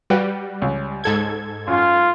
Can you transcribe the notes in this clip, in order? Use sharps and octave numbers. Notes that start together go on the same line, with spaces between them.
G3 F#4 B4 G5
C#2
G#2 A4 G#6
F#2 F4